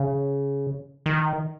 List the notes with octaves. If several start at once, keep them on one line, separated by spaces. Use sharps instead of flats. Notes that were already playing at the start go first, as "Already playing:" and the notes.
Already playing: C#3
D#3